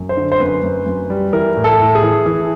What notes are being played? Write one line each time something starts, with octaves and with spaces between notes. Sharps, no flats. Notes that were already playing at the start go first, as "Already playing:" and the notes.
Already playing: F#2
C5
D3
C5
F#2 B4
F#2
F#2
G3
E3 A#4
A2
A4
A2
G#4
E3
E3